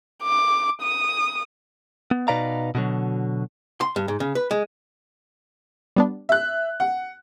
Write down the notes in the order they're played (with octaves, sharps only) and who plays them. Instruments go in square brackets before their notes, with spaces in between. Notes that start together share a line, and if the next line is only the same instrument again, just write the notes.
[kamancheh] D6
D#6
[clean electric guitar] B3
B2 D#4 B4 D5 F5 A#5
B2 D3 F#3
[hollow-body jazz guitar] C6
G2
G#2
C#3
B4
G#3
[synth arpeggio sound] G3 B3 D4
[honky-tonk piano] E5 F#6
F#5